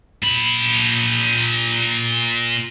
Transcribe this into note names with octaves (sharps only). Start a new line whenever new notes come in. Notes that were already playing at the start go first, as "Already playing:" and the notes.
A#2 B5